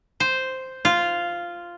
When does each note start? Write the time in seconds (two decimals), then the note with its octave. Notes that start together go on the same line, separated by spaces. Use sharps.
0.20 C5
0.85 F4